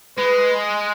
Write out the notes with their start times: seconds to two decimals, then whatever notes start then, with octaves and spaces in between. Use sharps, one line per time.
0.18 G#3 B4